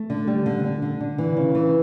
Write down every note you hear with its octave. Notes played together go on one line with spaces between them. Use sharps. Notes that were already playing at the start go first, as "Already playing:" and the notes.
Already playing: A3
D3
G3
D3
D3
D3
D3
E3
C#3
E3